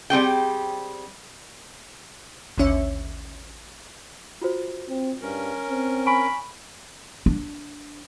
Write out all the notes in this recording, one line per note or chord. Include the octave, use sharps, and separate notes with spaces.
G3 C4 G#4 G5
A1 D#2 D3 C#4 C#5 E5
F4 F#4 C5
C4
G2 C#4 A#4
C4
G#5 B5 C#6 D7
D4